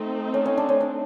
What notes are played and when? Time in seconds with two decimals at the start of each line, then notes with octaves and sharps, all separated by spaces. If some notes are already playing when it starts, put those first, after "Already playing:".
Already playing: A3 C4 D#4
0.34 C#4
0.46 C#4
0.57 D4
0.69 C#4
0.81 D4